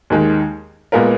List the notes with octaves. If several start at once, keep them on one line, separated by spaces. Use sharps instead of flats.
D#2 D#3 G#3
A#2 G#3 B3 F4 A#4